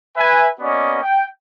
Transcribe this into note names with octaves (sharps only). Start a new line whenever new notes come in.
B4 E5 G#5
A#3 B3 C#4 F#4 D5 D#5
G5